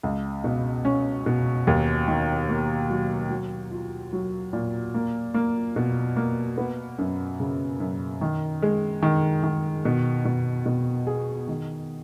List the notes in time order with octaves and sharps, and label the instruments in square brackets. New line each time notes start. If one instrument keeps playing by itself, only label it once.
[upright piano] C#2
B2
C#4
B2
D#2
D#3
A#3
F#3
F#3
F4
F#3
A#2
A#3
A#3
B2
A#3
B3
F#2
C#3
F#2
D#3
G#3
D#3
D#3
B2
B2
B2
G#4
D#3